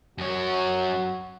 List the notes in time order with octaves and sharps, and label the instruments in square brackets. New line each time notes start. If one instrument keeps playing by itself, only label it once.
[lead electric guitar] F#2 C#5 [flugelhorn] F#4